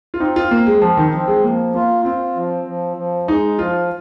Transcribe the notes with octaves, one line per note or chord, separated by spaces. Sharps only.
F4
C4 D#4
F4
A#3 C4
G#3
F3 C4
D#3
F3 C4
G#3
F3 A#3
A#3 F4
C4 F4
F3
F3
F3
G#3 D#4
F3 F4